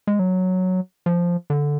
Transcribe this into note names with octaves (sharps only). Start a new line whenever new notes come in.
G#3
F#3
F3
D3